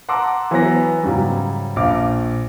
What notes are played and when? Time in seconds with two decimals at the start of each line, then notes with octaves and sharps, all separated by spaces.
0.09 F#5 A5 A#5 C6 D6 E6
0.51 E3 F#3 B3 A#6
1.03 G#2 C#3 F#3 G3
1.76 A#1 F5 D6